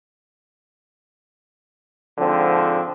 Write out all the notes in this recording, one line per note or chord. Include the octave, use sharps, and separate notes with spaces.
G#2 D3 F3 C4